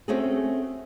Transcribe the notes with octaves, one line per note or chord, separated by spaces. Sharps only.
A3 C4 C#4 F#4 G#4